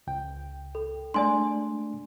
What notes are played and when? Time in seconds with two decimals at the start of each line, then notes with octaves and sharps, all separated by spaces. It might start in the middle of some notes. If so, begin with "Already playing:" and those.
0.07 C#2 G5
0.75 A4
1.14 G#3 A3 D4 D5 G#5 C6